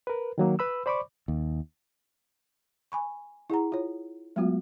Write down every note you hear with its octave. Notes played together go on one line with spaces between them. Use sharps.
A#4 B4
D#3 F#3 A#3
B4 B5 E6
C5 D5 B5 C#6 D6
D#2
G#5 B5 C#6
E4 G#4 F#5 A#5
F4 C#5
F#3 G#3 A3 B3 F4 F#4